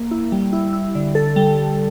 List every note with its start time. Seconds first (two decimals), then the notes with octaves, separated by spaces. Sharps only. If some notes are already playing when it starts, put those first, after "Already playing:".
Already playing: A#3
0.11 E4
0.32 G3
0.53 E4
0.73 E4
0.95 D3
1.15 A4
1.36 G3
1.57 G3